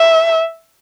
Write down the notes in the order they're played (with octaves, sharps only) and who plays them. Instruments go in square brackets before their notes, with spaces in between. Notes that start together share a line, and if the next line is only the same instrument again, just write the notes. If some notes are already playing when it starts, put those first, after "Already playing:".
Already playing: [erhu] E5